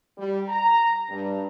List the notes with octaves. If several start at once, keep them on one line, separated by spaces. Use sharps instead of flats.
G3
A#5
G2